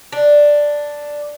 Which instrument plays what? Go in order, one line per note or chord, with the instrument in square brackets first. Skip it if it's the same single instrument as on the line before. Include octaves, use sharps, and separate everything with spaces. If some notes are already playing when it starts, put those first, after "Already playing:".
[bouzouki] D4